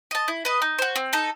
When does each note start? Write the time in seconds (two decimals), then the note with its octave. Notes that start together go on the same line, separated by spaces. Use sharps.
0.11 D#5 A5
0.28 E4
0.45 B4 D#5
0.62 D#4
0.78 F#4 C5
0.96 C4
1.13 D#4 A4